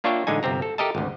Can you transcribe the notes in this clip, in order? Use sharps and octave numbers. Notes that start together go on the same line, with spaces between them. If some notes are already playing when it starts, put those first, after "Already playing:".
A#3 D4 F4 C#5 E5 G5
A1 D3 G#3 D#4 G#5
G1 C3 C4 A#5
A4
G4 A4 A#4 D#5 E5 A5
G#1 D2